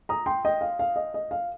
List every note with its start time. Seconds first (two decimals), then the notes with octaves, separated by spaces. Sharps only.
0.09 A#5 D#6
0.26 G5 C6
0.45 D#5 G5
0.61 F5
0.79 F5
0.96 D#5
1.14 D#5
1.31 F5